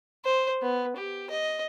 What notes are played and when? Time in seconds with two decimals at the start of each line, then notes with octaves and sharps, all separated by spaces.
0.25 C5
0.62 B3
0.97 G4
1.30 D#5